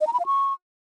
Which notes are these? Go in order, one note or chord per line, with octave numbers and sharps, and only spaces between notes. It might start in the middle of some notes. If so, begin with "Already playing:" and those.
D#5
A#5
B5
F5
C#6